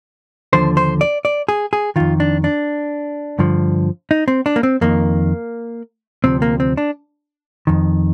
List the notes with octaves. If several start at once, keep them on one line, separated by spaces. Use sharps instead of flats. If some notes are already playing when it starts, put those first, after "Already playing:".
D#2 D3 F3 C5
C5
D5
D5
G#4
G#4
F2 D#3 F4
D4
D4
G2 D3 F3
D#4
C4
D4
A#3
C4
F2 D#3 A#3
D2 C3 F3 C4
A#3
C4
D4
F2 D#3